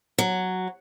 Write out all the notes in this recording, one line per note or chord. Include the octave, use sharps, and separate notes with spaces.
F#3